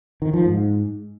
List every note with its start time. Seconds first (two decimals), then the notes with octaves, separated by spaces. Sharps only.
0.22 D#3
0.33 F3
0.45 G#2